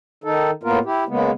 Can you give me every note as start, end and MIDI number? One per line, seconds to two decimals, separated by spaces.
0.24 0.51 51
0.24 0.51 63
0.24 0.51 69
0.63 0.79 45
0.63 0.79 58
0.63 0.79 59
0.63 0.79 65
0.63 0.79 70
0.85 1.04 64
0.85 1.04 67
1.08 1.31 49
1.08 1.31 56
1.08 1.31 58
1.08 1.31 59